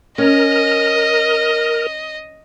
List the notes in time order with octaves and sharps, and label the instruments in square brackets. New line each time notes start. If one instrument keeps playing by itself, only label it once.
[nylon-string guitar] C#4 [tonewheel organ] A#4 [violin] D#5